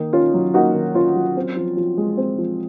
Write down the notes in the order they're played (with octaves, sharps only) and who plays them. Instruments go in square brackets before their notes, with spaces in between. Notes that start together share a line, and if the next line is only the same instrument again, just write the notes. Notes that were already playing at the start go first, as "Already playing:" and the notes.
Already playing: [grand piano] D#3 A#3 D#4
C#4 F4
F#3
A#3 D#4 F#4
D#3
C#4 F4
F#3
C4
F3
F3
G#3
C4
F3